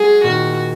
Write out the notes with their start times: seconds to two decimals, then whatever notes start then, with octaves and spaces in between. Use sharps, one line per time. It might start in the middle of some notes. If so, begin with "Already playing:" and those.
Already playing: F#3 G#3 G#4
0.23 A#2 D#3 F#4